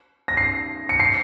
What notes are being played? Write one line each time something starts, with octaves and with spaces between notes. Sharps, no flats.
A#6
C7
C#7
C7